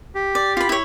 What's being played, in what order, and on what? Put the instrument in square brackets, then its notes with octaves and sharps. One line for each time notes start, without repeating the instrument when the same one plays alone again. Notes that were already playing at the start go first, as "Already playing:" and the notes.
[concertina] G4
[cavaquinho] D5
F4 B5
E4 C#5